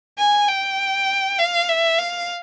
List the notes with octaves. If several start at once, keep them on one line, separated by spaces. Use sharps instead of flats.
G#5
G5
F5
E5
F5